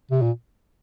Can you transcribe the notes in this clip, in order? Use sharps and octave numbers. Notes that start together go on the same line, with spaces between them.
C3
A#2